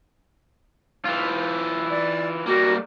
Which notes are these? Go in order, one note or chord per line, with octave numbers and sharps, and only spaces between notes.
E3 F4
D5
G3 A#3 F#4